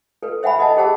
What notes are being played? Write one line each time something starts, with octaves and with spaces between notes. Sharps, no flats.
A4 B4
C5 E5 F#5 G#5 B5
A4 D#5 F#5 A5
G4 G#4 C5 F#5 A5 E6